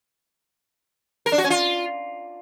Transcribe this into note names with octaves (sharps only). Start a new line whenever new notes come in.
A#4
D4
F#4
C#4
F4